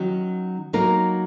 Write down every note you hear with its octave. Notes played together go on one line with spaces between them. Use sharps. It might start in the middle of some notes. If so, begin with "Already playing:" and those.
Already playing: D#3 F#3 C#4
F#3 A#3 D#4 A#4